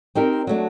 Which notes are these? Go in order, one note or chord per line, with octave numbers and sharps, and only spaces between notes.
C4 D#4 G4 A#4
F#3 A3 D4